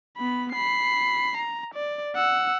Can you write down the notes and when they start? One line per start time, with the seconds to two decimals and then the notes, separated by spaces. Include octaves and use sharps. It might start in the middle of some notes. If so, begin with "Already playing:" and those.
0.17 B3 B5
0.52 B5 C7
1.37 A#5
1.74 D5
2.15 F#5 E6